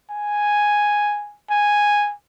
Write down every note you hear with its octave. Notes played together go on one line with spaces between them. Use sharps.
G#5
G#5